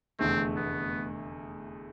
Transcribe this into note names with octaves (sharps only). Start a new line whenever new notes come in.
F1 E2 D3 A3 C4
B3